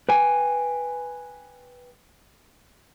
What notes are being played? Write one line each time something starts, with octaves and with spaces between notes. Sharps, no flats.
B4 G5 G#5